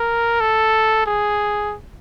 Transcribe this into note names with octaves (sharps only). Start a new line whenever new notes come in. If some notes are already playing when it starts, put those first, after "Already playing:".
Already playing: A#4
A4
G#4